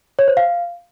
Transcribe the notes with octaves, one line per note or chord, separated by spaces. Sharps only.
C#5
C5
F5